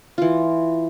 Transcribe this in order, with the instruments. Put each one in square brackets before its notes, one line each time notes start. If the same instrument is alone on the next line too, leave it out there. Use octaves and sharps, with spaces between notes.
[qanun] E3 F4